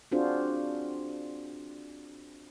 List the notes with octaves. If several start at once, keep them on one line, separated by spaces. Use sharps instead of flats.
C4 D4 F4 F#4 G#4 C5